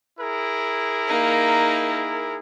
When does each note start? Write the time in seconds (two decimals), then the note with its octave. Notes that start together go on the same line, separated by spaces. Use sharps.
0.20 E4 G#4 A#4
1.08 A#3 D#4